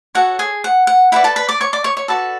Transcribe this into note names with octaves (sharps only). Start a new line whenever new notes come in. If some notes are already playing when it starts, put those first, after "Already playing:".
F#4 A4 C#5 F#5
G#4 G#5
F#5
F#5
E4 B4 D5 F#5
A4 A5
B4 B5
D5 D6
C#5 C#6
D5 D6
C#5 C#6
C#5 C#6
F#4 A4 B4 D5 A5